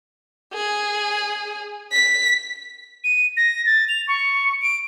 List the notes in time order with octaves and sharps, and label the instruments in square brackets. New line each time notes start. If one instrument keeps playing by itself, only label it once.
[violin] G#4
B6
[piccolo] D#7
A#6
A6
F7
C#6
D7